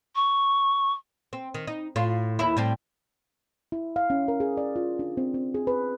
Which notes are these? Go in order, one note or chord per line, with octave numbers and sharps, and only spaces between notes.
C#6
C4
D#3
D#4
A2 F4
D#2 E4
A2 G3 C4
E4
F5
C#4
A#4
G#4
D5
F4
D4
C4
C4
G#4
B4